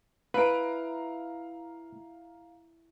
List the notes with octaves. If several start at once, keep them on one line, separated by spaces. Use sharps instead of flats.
E4 B4 F5 A#5 D7